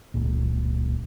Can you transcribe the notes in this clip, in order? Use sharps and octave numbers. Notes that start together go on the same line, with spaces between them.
D#1 C#2 A#2